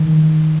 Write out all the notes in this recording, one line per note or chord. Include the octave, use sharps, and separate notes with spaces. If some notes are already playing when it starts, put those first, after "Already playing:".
Already playing: D#3